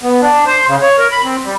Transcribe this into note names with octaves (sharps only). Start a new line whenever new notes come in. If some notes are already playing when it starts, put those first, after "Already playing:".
B3
D4
C5
C#3
C#5
A#4
B5
C4
G3